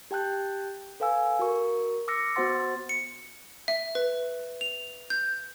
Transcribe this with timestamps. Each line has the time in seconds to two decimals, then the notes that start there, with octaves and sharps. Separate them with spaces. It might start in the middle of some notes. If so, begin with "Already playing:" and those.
0.11 G4 G5 A5 F#6 G6
1.00 A4 B4 F5 G#5 E6
1.39 F#4 A#4 C#6
2.08 D6 E6 F6 A#6 C#7
2.35 B3 F#4 C5 F#5 C6 A6
2.89 C#7
3.68 E5
3.95 B4
4.61 F7
5.10 G6